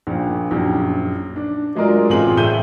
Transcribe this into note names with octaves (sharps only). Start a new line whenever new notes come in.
A#1 A#2
A#1 F#2
D4
F#3 G#3 F4 A#4 D5
A1 C4 F4 G#4 F#7
A2 A3 E5 G6 D#7 G7